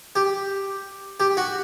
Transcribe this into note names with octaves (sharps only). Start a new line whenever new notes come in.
G4
G4
F#4